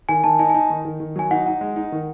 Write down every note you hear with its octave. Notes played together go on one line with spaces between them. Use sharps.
D#3 G#5
D#3 A5
D#4 G#5
G#5
D#4
D#3
D#3
D#3
F#3 G#5
D#4 F#5
D#4 F#5
G#3
D#4
D#3